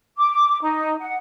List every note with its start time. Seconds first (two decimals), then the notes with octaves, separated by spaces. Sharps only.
0.17 D6
0.61 D#4
1.00 F#5